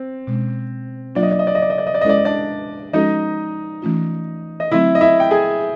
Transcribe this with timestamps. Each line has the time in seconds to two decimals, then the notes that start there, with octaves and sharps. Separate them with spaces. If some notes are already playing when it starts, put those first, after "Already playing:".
Already playing: C4
0.27 B2 G#3 C#4
1.15 F#3 A#3 D4 F4 D5
1.23 D#5
1.31 D5
1.39 D#5
1.47 D5
1.55 D#5
1.62 D5
1.70 D#5
1.78 D5
1.87 D#5
1.94 D5
2.01 D#5
2.05 G#3 C#4 E4 A4 C5 D5
2.18 D#5
2.25 D4 D5
2.93 F3 G#3 C#4 D#4 F#4 A4 D#5
3.82 E3 A3 C#4 F4
4.60 D#5
4.71 D3 F#3 A3 C4 E4 E5
4.95 D#5
5.01 E4 E5
5.20 G5
5.31 G#4 G#5
5.61 G#4